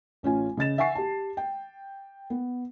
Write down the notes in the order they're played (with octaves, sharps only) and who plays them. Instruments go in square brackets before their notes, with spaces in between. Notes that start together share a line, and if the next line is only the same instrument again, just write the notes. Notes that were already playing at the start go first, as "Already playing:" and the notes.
[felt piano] A1 C#4 F4 G#5
C#3 D#5 A6 E7
E5 F#5 G#5 C#6 C7
G4 A5
G5
B3